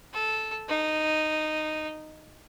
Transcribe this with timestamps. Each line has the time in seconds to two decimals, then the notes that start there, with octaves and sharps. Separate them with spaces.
0.14 A4
0.69 D#4